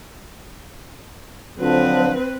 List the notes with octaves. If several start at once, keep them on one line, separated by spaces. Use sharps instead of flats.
D3 F3 F#3 C4 B4